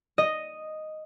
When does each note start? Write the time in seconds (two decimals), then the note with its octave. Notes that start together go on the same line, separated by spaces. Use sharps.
0.18 D#5